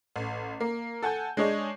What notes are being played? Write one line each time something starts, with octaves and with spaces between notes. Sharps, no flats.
A1
A#3
A4 F#5 G#5 G6
G#3 D4 G#4 C#5 D#5